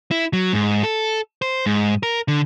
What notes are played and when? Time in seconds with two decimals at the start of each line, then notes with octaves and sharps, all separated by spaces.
0.11 E4
0.33 F#3
0.53 G#2
0.84 A4
1.42 C5
1.66 G#2
2.03 A#4
2.28 D3